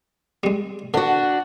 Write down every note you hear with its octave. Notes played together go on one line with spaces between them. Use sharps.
G3 G#3
D3 D4 F#4